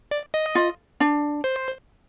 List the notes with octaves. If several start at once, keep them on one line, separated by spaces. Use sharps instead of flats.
D5
D#5
F4
D4
C5